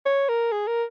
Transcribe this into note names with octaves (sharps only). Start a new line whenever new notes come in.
C#5
A#4
G#4
A#4